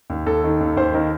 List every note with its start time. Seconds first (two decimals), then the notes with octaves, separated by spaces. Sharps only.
0.10 D#2
0.26 D#2 A4
0.44 D#3
0.61 D#2
0.77 D#2 C5
0.94 D#3 A#4